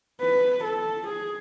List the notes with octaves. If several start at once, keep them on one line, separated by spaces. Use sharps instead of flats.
B4
A4
G#4